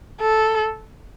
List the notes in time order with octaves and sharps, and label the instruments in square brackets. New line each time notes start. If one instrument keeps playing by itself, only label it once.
[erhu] A4